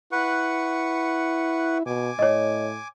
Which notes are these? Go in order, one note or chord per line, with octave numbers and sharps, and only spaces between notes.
E4 B4 F#5 C#6
B2 G#5 D6
A2 C#5 D#5